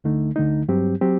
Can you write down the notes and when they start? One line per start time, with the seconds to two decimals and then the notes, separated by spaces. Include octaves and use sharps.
0.04 D2 D3 A3 D#4
0.36 D2 D3 A3 D#4
0.68 G2 F#3 C4 G4
1.01 F#3 C4 G4